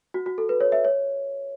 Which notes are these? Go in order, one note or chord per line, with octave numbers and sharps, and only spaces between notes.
F#4
F#4
A4
B4
C#5
E5
C#5